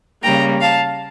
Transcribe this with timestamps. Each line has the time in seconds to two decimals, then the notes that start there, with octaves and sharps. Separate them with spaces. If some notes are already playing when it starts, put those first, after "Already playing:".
0.22 C#3 G3 A#3 G5 A#5
0.61 F5 A5